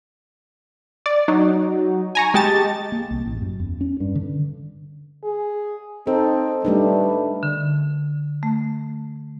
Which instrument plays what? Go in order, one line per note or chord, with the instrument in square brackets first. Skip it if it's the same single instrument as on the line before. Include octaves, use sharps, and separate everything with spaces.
[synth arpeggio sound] D5
F#3 D#4
G#5 A#5 C#6
G#3 G4 A5 A6
[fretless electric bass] A#3
C2
A1
F#2
E2
C#4
G2
D3
[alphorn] G#4
[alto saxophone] C4 [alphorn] D#4 [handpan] A4
[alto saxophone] G3 [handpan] A3 D4 D#4 [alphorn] B4
[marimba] D3
A3